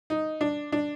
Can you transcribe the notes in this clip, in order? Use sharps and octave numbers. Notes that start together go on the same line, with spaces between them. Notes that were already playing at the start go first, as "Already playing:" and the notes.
D#4
D4
D4